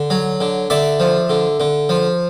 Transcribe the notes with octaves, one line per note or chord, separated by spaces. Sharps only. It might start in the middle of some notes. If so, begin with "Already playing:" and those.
Already playing: D3
F#3
D3
D3 D5 E5
F3
D3
D3
F3